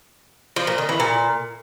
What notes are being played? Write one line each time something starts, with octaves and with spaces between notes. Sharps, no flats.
F3
A#2
D#3
E3
A#2